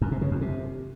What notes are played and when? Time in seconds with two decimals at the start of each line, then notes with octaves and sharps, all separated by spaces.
0.02 F#2
0.11 C3
0.21 C#3
0.31 F2
0.41 C3